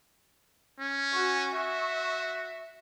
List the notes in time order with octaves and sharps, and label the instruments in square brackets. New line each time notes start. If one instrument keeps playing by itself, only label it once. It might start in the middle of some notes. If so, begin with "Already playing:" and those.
[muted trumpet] C#4
[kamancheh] F#4 G#5 [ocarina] C#6
[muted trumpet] F#4 [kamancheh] E5